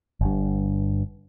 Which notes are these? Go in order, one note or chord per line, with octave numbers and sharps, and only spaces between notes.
G1 G2